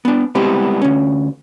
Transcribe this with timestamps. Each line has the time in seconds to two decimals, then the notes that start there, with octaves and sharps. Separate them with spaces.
0.05 B3 D4
0.35 G3 G#3 B3 C4 E4 G4
0.82 D2 C#4